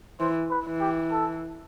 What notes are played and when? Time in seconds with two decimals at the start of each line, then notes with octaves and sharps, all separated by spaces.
0.20 E3 C5
0.50 B4
0.66 E3
0.80 G4
1.11 A4